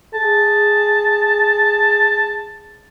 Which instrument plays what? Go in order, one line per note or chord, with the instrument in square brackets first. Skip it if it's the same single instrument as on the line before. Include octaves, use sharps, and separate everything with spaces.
[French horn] G#4 [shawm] A5